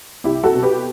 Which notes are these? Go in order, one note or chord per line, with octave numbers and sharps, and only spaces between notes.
C2 E4 G4
F#4 A4
B2
G4 B4